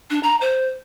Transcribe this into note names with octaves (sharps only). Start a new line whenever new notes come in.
D4
A#5
C5